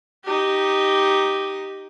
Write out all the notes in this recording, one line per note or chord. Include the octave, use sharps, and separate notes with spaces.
D#4 G4